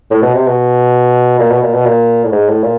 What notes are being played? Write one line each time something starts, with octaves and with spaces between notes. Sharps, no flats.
A2
B2
C3
B2
A#2
B2
A#2
B2
A#2
A2
G#2
A2
A#2